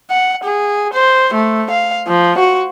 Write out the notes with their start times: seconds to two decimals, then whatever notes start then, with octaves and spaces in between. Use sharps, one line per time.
0.11 F#5
0.44 G#4
0.93 C5
1.34 A3
1.70 F5
2.08 F3
2.38 F#4